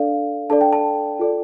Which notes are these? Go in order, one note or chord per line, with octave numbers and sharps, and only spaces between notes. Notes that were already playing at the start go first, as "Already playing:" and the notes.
Already playing: D4 A4 D5 F5
D4 A4 D5 A5
G5
A5
F4 A4 D5